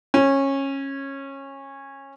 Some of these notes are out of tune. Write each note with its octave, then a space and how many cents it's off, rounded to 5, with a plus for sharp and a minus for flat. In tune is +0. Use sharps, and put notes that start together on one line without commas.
C#4 -20